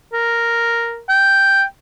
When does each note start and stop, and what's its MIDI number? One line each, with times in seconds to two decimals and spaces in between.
0.13 1.01 70
1.09 1.63 79